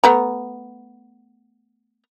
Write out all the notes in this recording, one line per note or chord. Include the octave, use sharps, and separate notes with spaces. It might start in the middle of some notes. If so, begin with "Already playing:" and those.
A3 B3 A#5